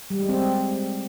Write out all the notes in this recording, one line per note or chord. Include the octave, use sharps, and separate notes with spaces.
G3
G#3
C4